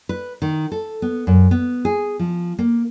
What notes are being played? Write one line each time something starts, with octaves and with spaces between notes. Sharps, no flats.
B4
D#3
A4
B3
F#2
B3
G#4
F3
A#3